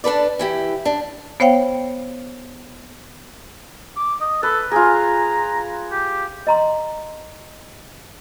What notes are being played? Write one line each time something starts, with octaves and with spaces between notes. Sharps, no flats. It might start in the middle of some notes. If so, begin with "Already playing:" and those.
D4 A4 B4 D5
E3 E4 G4
D4
B3 C5 C#5 F5 G5
D6
D#5
A4 B4
F4 G#4 A#5
G4
D#5 A#5 C6